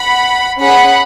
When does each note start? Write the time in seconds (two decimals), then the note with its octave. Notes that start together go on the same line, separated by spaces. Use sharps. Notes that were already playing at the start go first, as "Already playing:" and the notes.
Already playing: F#5 B5
0.60 C#4 G#4 F#5 B5